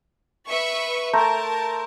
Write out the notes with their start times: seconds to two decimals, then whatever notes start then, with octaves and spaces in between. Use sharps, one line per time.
0.48 B4 E5 C#6
1.13 A3 A#4 C5 A5 A#5